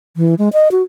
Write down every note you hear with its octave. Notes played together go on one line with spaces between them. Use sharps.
E3
G#3
D#5
F#4